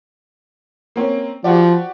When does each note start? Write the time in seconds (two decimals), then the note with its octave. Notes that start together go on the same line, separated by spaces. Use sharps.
0.96 A#3 C4 C#4
1.44 F3 F#4 G4 D5